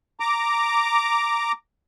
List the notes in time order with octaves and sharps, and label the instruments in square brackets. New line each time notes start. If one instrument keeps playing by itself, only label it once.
[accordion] A#5 D6